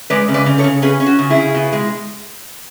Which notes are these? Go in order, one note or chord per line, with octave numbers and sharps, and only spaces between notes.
G#3 B4 D5
C#3
B4 D5
C#3
A4 C#5
C#3
C#4 G#4 B4
C#4
F#4
C#3
E4 G#4
C#3
B2
G#3